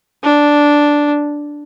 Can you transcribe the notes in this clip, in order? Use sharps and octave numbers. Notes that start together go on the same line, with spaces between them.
D4